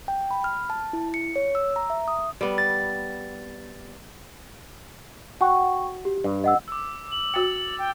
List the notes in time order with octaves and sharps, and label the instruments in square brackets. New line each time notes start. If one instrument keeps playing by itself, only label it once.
[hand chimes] G5
B5
F6
A5
E4
C#7
C#5
E6
A#5
E5
D#6
[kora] G3 B3
[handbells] A6
[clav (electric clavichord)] F#4 [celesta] G5 C#6
[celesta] G4
[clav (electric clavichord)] G2
[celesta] D#5 F#5 E6
[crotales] D6 E6
[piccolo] F#7
[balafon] F#4 G5 [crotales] A6 C#7
[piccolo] G5